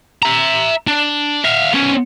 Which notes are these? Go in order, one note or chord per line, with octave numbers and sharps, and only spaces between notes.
E5 A#5
D4
E5 F5
B3 C#4